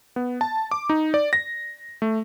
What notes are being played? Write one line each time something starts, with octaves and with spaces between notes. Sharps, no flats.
B3
A5
D6
D#4
D5
A#6
A3